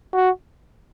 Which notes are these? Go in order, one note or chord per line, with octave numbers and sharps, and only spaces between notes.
F#4